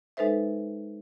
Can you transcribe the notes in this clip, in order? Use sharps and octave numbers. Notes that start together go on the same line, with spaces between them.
G#3 D#4 A4 B4 C5 E5